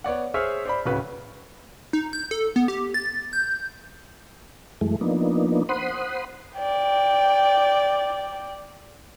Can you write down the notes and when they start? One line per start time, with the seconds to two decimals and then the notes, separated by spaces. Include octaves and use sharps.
0.04 B3 C#5 D5 F#5
0.34 G#4 C5 C#5 E5 E6 F6
0.65 C5 D5 B5
0.85 D1 C#3 F#4 B4
1.93 D#4
2.13 G6
2.31 A4
2.56 B3
2.68 G4
2.94 A6
3.33 G6
4.81 F#2 E3 G#3 A3
5.01 F3 A#3 B3 D4 D#4
5.69 C5 F#5 B5 C6 D#6
6.58 D5 G5